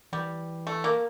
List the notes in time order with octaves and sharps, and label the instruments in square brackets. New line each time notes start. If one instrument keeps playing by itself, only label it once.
[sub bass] E3 [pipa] G3
[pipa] A3
A#3